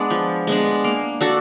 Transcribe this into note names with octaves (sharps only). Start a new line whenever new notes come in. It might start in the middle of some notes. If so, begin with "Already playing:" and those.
Already playing: G#3 B3 D4
F3
G#3 B3 D4
A#3
D4 F#4 A4